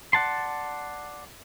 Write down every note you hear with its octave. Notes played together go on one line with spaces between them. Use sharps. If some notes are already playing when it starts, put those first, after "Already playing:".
D5 F#5 A5 C6